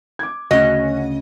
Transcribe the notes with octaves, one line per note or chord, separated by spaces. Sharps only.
D6 G#6
D2 C#3 C#4 F#4 D#5